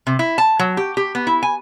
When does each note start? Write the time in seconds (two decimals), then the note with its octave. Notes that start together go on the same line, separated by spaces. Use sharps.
0.07 C3
0.19 E4
0.38 A5
0.59 F#3
0.77 G4
0.97 G4
1.15 B3
1.27 E4
1.43 G#5